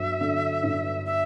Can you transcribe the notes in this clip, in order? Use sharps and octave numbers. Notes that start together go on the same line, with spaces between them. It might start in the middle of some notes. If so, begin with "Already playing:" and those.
Already playing: G1 F#3 E5
D3
G1
E5